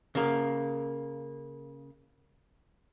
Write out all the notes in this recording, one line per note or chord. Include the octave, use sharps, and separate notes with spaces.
C#3 A#3